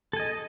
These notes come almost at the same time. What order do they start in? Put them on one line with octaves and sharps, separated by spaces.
A4 G#5 D#5